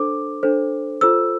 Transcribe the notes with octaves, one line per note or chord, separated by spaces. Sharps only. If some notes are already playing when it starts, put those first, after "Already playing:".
Already playing: D4 A4 C5 D6
D4 A4 C5
F4 A4 C5 E6